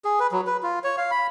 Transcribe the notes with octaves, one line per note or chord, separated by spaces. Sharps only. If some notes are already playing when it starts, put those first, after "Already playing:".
G#4
B4
F#3
B4
F4
C#5
F5
B5